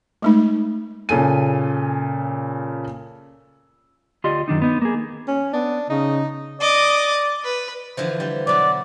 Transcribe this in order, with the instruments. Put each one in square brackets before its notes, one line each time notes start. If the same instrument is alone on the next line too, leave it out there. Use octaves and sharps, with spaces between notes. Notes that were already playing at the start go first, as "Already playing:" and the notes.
[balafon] G#3 A3 D#4
[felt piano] A#2 C#3 A4 G#5 D#7
[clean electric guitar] D2 F4 G4 D5 D#5 C6
F#2 D#3 D4 D#4
B3 D#4
A#3 G#4
[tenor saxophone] C#4
[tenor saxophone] B3 [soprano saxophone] D4
[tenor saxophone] C#3 [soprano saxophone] D#4
[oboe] D5 [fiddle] D#5 D6
[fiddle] B4
[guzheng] D3 E3 F3
G3
[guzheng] B2 F#3 [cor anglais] D5